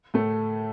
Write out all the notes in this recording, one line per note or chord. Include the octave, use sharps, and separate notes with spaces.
A2 A3